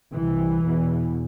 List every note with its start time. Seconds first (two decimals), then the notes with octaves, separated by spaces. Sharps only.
0.13 C2 C3 E3
0.64 E2 B2